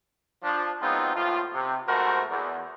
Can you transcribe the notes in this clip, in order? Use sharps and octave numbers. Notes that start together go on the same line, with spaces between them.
F3 D4
F#3 G#3 B3 C4 D#4 F4
D#2 A2 F3 F4
C3
G#2 B2 A3 F#4 A#4 C5
E2